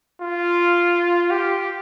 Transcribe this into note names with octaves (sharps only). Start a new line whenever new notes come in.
F4
G4